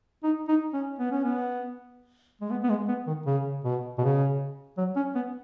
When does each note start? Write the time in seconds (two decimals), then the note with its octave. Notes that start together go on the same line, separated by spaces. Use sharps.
0.23 D#4
0.48 D#4
0.73 C#4
0.99 B3
1.11 C#4
1.24 B3
2.41 G#3
2.51 B3
2.63 B3
2.69 G#3
2.88 B3
3.07 D#3
3.26 C#3
3.64 B2
3.98 B2
4.02 C#3
4.78 F#3
4.96 C#4
5.15 B3